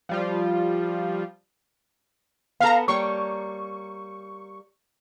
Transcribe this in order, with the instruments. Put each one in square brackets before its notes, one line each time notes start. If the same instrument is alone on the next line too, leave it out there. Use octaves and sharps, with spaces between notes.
[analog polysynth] F3 G3 F4
[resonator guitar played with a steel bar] B3 A4 [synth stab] F5 A#5
[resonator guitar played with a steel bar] G3 A#3 C#5 [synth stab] C#6